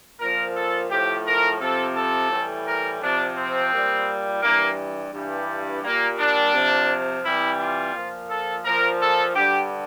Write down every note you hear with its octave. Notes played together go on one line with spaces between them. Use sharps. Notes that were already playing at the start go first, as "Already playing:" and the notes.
A#2 F3 A#4
A4
A2 F3 G4
A#4
C3 F3 A4
A4
A2 E3 G3
A#4
C3 F3 D4
C4
A#2 G3
G2 E3 G3 A#3
G2 E3 G3
A#2 G3 A#3
D4
C3 F3
C3 E3 G3 E4
F4
A#2 F3
A4
A#2 F3 A#4
A4
G2 D3 G3 G4